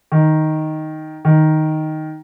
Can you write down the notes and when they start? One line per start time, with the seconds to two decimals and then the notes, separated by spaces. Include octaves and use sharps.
0.12 D#3
1.25 D#3